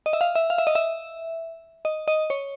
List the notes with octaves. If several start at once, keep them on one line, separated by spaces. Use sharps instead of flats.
D#5
E5
F5
E5
F5
E5
D#5
E5
D#5
D#5
C#5